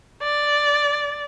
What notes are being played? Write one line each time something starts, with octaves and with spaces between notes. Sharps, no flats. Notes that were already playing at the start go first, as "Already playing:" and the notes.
D5